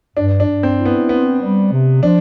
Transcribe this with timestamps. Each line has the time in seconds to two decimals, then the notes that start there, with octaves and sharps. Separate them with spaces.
0.16 G2 D4
0.40 D4
0.47 G2
0.63 C4
0.79 E4
0.85 B3
1.09 B3 C4
1.40 G3
1.72 C3
2.03 F3 D4